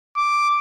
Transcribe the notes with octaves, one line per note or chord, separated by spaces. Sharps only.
D6